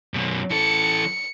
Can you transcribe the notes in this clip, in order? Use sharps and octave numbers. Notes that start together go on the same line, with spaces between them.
F#2 B2
E3 A4 C#7